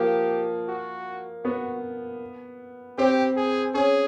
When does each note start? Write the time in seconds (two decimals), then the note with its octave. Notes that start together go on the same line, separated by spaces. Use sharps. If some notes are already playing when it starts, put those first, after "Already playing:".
Already playing: F3 A#3 G4
0.68 F#4
1.44 B3 F#4
2.98 C4 G4
3.36 G#4
3.74 C#4 G#4